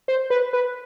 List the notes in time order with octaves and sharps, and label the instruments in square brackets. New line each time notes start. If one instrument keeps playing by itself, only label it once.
[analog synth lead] C5
B4
B4